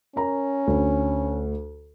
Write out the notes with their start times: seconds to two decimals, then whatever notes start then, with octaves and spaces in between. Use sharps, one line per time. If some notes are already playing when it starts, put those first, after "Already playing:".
0.16 C#4 A#4 A#5
0.67 D2